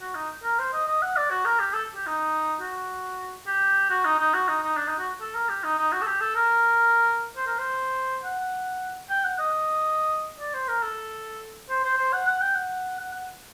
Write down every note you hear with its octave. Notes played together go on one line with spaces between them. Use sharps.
F#4
D#4
A#4
C5
D#5
D#5
F#5
D5
F#4
A#4
G4
A4
G4
D#4
F#4
G4
F#4
D#4
D#4
F#4
D#4
D#4
D4
D#4
F#4
A4
A#4
G4
D#4
D#4
F#4
A4
G4
A4
A#4
C5
A#4
C5
F#5
G5
F#5
D#5
D5
C5
A#4
A4
C5
C5
C5
F#5
F#5
G5
F#5
F#5
F#5